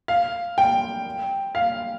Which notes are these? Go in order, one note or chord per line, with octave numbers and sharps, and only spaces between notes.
F5
G5
F5